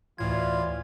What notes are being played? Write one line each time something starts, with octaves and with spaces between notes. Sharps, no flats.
D2 A2 E3 F4 D5 G#6